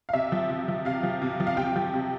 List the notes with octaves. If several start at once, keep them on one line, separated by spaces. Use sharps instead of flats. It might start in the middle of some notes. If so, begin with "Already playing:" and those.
F5
C3 E5
F3
C3
F3
C3 F5
F3
C3
F3
F5
C3 G5
F3
C3